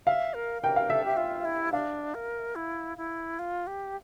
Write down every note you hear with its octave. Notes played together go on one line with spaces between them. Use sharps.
E5 F5
A#4
A#4 G5
F5
A4 E5
G4
F4
E4
D4 F5
A#4
E4
E4
F4
G4